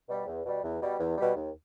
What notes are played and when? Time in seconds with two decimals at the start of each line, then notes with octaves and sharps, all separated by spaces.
0.09 B2 G3
0.27 E2
0.45 B2 G3
0.63 E2
0.81 B2 G3
0.99 E2
1.18 B2 G3
1.35 D#2